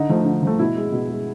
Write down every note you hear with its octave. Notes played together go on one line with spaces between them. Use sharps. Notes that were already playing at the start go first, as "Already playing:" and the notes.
Already playing: D3 D#4
F3 A3
D3
F3 A3
B2 E4
G#3
B2
G#3